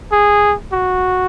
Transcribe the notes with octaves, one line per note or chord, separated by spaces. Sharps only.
G#4
F#4